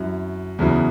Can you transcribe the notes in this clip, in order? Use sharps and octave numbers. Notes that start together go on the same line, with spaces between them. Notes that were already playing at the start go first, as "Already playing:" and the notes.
Already playing: F#2 F#3 E4
E2 C#3 F#3 E4